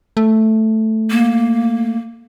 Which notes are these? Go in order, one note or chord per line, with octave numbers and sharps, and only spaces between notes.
A3
A#3